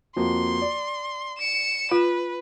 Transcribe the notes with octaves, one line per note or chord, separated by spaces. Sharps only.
F2 A#3 F#4 C6
D5
C#7 E7
F4 B4